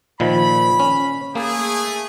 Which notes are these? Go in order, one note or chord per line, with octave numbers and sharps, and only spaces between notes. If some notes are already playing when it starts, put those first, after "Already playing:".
A#2 D#3 F3 B5
C#4
A3 A#3 G#4